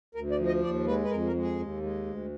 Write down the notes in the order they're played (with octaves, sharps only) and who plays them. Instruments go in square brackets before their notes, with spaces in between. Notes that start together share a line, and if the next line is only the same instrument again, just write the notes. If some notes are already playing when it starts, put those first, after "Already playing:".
[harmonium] D2 A#4
D5
F3
D#5
D#2 D5
G#3 B4
B4
F2 A#4
A#4
G#3
G#4
D#2
G#3
D2